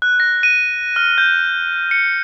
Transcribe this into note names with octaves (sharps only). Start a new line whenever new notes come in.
F#6
A#6
D#7
F6
G6
C#7